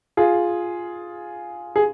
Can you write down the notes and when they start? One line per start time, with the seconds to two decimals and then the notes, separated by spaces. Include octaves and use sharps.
0.17 F4 G#4
1.76 G#4